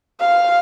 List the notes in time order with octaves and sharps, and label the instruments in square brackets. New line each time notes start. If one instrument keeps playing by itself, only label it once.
[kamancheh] F5